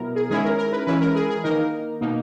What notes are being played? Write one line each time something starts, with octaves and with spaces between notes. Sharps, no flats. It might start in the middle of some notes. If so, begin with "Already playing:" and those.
Already playing: B2 F#3 B3 E4 A#4
G#4
D#3 G#3 C#4 E4 G#4
A#4
A#4
B4
E3 G#3 C#4 E4 B4
A#4
G#4
G#4
D#3 A#3 D#4 A#4
B2 A#3 D#4